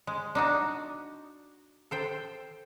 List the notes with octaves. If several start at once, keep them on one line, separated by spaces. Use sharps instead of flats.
G#3
D4 D#4 F#4
A4 C5 G5